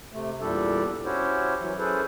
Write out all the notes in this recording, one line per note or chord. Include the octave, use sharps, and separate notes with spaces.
C3 A3
E2 A#2 G3 D4 G4 A4
C#4 E4 F#4 G4 C5 C#5
E3 F#3
C#4 E4 G#4 A4 B4 C5